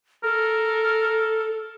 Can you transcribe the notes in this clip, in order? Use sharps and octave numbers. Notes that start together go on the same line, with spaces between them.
A4 A#4